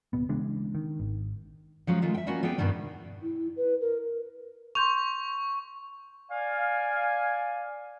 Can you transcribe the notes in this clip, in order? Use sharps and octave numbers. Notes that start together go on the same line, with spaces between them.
D1 B2 B3
C#3 E3 G#3 D4
D#3
G#1
F3 F#3 G#3 C#4
D#3 G#3 A3 F4
E5 G5
G3 A#3 B3 C#4 F#4
G3 B3 G#4 G5
G2 B2 D#3 G3 D4
E4
B4
A#4
C6 C#6 G6 F7
D5 F5 G#5